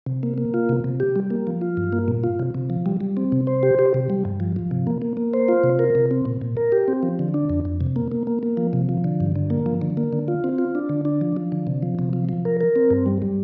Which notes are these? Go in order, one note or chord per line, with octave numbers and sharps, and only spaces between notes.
C3
A#3
A#3
F4
C3
C3
G4
G3
A#3
F3
F4
G2
A#3
A#2
F4
C3
C3
F3
G3
G3
C4
C3
C5
G4
G4
C3
G3
G2
F3
F3
C3
A#3
A#3
A#3
C5
F4
C3
A#4
C3
C4
A#2
A#2
A#4
G4
C4
F3
D3
D4
F2
F2
C3
A#3
A#3
A#3
A#3
F3
C3
F3
D3
G2
D3
A#3
F3
D3
A#3
D3
F4
C4
F4
D4
D3
D4
F3
F3
D3
C3
F3
C3
F3
F3
A#4
A#4
C4
G2
G3
G3